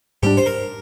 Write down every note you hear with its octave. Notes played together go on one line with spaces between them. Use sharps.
G#2 G3 D4 G4
C5
A#4